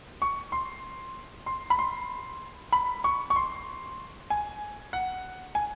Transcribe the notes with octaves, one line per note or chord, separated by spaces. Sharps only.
C#6
C6
C6
B5
C6
B5
C#6
C#6
C6
G#5
F#5
G#5